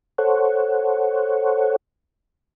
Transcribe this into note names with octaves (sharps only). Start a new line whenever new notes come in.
A4 C5 C#5 F#5